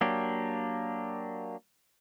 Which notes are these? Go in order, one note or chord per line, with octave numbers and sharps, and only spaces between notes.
F#3 A#3 D4 G4